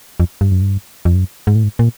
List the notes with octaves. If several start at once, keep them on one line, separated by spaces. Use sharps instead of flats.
F2
G2
F#2
G2
F2
F#2
G#2
A2
G#2
A#2